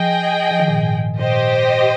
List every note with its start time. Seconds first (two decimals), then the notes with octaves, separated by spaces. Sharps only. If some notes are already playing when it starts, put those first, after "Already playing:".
Already playing: F3 G#4 D#5 G5
0.51 F3
0.60 D#3
0.68 A#2
0.77 G#2
1.19 A#2 G4 C5 D#5